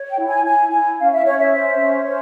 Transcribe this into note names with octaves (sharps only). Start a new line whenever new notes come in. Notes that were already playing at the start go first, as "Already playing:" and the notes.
Already playing: C#5
G5
E4
G#5
E4 G#5
E4 G#5
C#4 F5
E5
C#4 C#5
E5
C5
C#4
C5